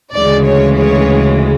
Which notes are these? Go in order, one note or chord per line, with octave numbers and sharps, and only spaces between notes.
D2 C#3 E3 G#3 D5
C#5
C#5